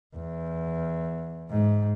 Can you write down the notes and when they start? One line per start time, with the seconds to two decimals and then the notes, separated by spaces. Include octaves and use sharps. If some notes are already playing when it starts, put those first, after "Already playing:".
0.16 E2
1.50 G#2